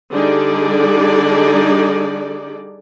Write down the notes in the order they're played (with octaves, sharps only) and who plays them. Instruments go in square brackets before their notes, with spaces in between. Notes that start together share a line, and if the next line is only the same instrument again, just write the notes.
[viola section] D3 G3 D4 D#4 G#4 D5